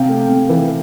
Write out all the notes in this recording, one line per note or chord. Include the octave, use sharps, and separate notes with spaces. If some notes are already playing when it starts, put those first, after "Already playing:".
Already playing: C3 F5 G5
A3
C3
E3